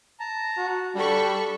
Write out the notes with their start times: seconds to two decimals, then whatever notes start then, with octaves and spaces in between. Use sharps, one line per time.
0.20 A5 A#5
0.57 F#4
0.95 G3 D4 A4 B5 C#6